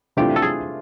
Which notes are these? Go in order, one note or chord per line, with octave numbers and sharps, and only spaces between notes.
C3 E3 A3 D4 F4 G4
A4
G#4